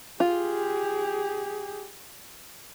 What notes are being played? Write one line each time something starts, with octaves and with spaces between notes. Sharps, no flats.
F4 G4 G#4